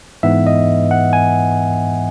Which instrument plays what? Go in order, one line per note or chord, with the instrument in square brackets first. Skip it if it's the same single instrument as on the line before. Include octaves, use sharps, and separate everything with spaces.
[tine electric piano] G#2 E3 B3 E5
D#5
F#5
G#5